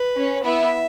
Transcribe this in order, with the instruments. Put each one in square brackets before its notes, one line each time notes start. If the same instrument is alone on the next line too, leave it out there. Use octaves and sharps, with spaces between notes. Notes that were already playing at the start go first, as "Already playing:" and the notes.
Already playing: [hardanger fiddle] B4
[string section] C#4
[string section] B3 E4 [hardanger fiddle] E5